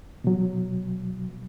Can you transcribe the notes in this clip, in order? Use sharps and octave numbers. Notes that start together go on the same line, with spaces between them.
B2 F#3